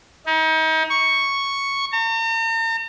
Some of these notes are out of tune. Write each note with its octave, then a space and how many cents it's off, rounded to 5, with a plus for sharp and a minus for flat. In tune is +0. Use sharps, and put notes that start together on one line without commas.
D#4 +35
C#6 +0
A#5 -45